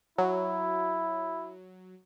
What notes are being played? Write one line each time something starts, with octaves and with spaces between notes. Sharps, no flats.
F#3 E4